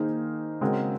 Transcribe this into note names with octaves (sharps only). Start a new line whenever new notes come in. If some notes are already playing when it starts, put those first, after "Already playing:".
Already playing: D#3 A#3 D#4 G#4 C5
C#3 G#3 C4 F#4 A#4